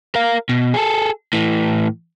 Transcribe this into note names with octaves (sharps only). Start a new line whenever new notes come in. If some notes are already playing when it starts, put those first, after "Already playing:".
A#4 F5
B2
G#4 A4
A2 E3